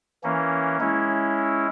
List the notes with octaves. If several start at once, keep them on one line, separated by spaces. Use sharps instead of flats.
E3 A#3 C#4
G#3 C#4 E4